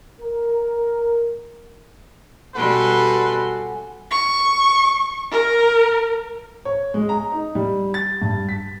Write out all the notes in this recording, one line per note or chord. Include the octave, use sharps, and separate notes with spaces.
A#4
B2 G3 F#4 A4 B4 F#5 G#5 C6
C#6
A#4
C#5
G#3
A#5
D#4
G3
A6
G2
B6